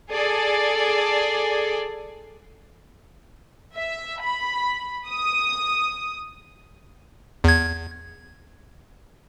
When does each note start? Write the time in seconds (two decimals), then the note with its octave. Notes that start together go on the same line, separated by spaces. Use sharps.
0.10 G#4 A4 D5
3.75 E5
4.21 B5
5.08 D#6
7.44 E2 G#6